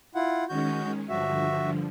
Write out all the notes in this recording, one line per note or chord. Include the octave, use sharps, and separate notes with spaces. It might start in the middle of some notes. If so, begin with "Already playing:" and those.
E4 F4 F#5
D#3 G#3 C#4 F#4 G6
G2 D3 F3 F#4 E5